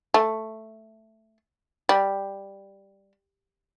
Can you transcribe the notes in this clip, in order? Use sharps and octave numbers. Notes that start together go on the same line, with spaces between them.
A3
G3